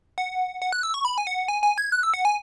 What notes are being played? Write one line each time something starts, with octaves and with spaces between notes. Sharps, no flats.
F#5
F#5
F#6
E6
C#6
B5
G#5
F#5
G#5
G#5
G#6
F#6
E6
F#5
G#5